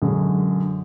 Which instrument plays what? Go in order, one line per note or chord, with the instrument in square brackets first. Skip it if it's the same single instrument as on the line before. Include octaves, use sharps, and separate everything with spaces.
[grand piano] F#2 D3 G#3